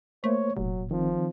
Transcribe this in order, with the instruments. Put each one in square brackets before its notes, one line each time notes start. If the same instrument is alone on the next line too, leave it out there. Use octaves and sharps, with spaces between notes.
[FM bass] A3 [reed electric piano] A#3 C5 [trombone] C#5
[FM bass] F1 [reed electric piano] A#2 [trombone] F#3
[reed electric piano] D#3 C4 [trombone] F3